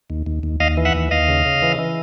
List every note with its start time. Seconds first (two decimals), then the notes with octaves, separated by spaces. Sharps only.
0.10 D#2
0.26 D#2
0.43 D#2
0.60 D#2 D#5 F5
0.77 E3
0.85 E5 F#5
0.95 D#2
1.11 D#2 D#5 F5
1.28 C#3
1.46 C#3
1.62 E3
1.79 E3